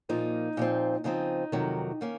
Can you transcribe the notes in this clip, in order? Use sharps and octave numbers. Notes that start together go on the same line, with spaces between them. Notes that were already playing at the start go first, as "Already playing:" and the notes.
A#2 F3 A#3 D#4
A#2 F3 C4
C#3 F3 C4 D#4
F2 C3 D#3 F#3
D#3 A#3 C#4